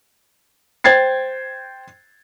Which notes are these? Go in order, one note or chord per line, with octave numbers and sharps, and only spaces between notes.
C5 G5 G#6 A6 C7